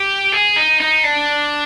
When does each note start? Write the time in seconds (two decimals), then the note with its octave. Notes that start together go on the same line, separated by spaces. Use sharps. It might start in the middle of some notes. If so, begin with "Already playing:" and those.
Already playing: G4
0.33 G#4
0.56 D#4
0.80 D#4
1.04 D4